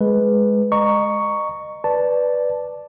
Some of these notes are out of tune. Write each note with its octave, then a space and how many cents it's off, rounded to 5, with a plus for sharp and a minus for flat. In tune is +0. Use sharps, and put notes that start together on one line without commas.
G#3 +10 B4 +0
D#5 -30 A#5 +0 C#6 +5
B4 +0 D5 +0 A5 +0